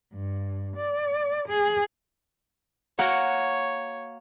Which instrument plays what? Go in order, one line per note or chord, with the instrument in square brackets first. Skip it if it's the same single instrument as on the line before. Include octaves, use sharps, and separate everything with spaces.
[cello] G2
D5
G#4
[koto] A#3 F#4 A#4 [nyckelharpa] C#5 [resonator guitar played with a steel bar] F#5